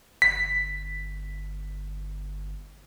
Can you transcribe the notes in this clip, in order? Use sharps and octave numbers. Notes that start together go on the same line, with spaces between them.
G1 B6